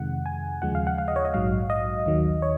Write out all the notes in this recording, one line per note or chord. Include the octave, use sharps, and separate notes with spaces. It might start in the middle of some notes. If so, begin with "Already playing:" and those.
Already playing: F2 C3 D#3 G#3 F#5
G#5
D#2 C#3 F3 G#3 F#5
F5
F#5
F5
D#5
C#5
D#5
A#1 G#2 F#3 F5
D#5
D#2 D#3 F#3
C#5